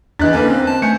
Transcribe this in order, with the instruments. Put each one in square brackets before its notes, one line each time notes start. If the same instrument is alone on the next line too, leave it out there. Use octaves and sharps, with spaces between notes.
[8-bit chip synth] E2 [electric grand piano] E3 F#6 A6 [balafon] D4 D#5
[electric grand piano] D3 A#3 B4 [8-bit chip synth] C#4
[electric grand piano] C4
[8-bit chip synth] A5
[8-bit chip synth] A3 [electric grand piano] G#5 G6 C#7